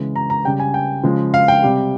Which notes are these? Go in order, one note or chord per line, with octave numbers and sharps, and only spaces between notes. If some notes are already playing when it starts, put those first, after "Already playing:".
Already playing: C#3 E3 G#3
A#5
A#5
C#3 G3 G5
G#5
G5
C#3 F3 G#3
F5
G5
C3 G3